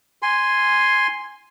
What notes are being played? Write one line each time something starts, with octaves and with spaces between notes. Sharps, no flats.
G#5 C6